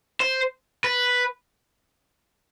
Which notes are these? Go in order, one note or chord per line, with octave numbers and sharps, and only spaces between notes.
C5
B4